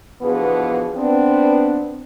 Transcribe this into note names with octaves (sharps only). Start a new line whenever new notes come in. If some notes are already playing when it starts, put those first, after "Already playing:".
B2 D3 E3 F3 B3 G#4
B3 C4 D4